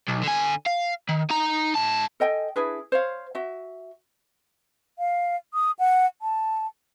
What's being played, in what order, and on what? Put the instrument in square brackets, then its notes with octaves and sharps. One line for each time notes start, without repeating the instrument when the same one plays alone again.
[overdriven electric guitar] B1
D3 G#5
F5
D#3
D#4 A#5
G#2 A5
[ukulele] A4 D#5 G5 G#5
D4 E4 G#4 B4
C5 C#5 F5
F#4 E5
[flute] F5
D#6
F#5
A5